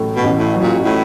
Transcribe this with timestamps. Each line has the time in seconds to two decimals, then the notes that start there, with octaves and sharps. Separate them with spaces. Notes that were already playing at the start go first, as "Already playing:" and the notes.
Already playing: A1 A2 F#3 A3
0.16 B2
0.23 A1
0.39 A2
0.54 F#3
0.61 A#2
0.85 A2